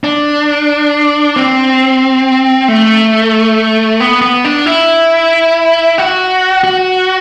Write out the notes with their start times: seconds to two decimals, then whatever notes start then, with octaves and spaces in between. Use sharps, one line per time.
0.04 D4
1.36 C4
2.68 A3
4.00 B3
4.22 B3
4.45 D4
4.66 E4
5.98 F#4
6.64 F#4